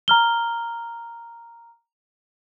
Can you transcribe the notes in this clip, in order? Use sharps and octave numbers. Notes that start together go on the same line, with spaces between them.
A#5 F6 G7